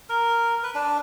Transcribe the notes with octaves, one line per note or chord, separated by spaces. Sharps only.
A#4
B4
D4